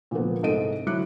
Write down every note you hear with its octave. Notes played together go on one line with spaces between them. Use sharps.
A#2 D3 F3 G#3 A#3 B3
C2 G#2 A4 D#5 D7 D#7
D3 F#3 E4 D6 F#6 C#7